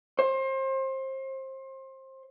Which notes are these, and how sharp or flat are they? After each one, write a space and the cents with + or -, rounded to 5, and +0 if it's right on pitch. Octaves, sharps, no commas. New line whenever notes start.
C5 +30